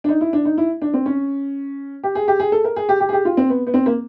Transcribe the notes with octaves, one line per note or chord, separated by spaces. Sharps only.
D4
D#4
E4
D4
D#4
E4
D4
C4
C#4
G4
G#4
G4
G#4
A4
A#4
G#4
G4
G4
G#4
G4
F4
C4
B3
B3
C4
A#3